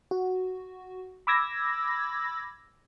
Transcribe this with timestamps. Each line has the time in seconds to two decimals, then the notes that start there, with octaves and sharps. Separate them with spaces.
0.11 F#4
1.27 B5 D6 E6 G#6 A#6